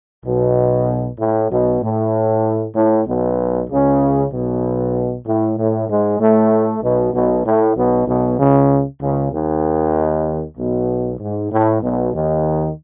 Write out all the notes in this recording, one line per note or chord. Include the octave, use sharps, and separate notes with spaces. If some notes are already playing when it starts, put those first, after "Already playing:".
B1 B2
A2
B1 B2
A2
A2
B1 B2
C#2 C#3
B1 B2
A2
A2
G#2 G#3
A2 A3
B1 B2
B1 B2
A2
B1 B2
B1 B2
C#2 C#3
C#2 C#3
D#2 D#3
B1 B2
G#2
A2
B1 B2
D#2 D#3